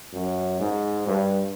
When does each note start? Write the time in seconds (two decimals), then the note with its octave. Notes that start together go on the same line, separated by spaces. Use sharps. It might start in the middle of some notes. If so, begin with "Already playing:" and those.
0.13 F#2
0.60 G#2
1.07 G2